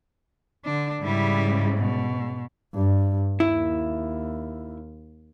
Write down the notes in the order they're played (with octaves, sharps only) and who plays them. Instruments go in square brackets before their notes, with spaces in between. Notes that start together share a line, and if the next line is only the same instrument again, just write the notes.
[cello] D3 D4
[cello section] G#2 C#3 [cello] G3 E4
[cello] B2
[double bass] G2
[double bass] D#2 [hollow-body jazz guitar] E4